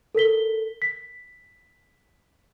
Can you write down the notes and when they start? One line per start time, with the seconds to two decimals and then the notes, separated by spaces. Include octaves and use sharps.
0.15 A4 A#4 B6 G7
0.82 B6